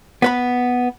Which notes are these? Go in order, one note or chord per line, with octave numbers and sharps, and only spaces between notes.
B3 B4 B5